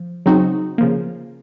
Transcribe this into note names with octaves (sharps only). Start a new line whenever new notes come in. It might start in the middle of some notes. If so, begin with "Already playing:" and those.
Already playing: F3
C#3 F#3 C4 D#4 F#4
C#3 F3 A#3